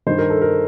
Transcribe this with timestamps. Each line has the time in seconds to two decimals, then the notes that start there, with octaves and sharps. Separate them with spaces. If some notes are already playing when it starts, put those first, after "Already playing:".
0.07 G2 D#3 C5
0.19 A#4
0.30 A4
0.42 A#4